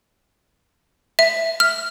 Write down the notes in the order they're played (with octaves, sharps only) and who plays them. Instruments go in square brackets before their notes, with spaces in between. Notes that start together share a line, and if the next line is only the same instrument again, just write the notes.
[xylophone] E5
F6